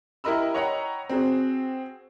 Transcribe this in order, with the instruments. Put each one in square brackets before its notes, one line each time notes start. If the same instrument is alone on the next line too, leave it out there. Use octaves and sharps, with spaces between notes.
[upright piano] E4 G4 A#4 D#5 B5 E6
C#5 D#5 F#5 G5 A#5 B5
C4 F#4 G#4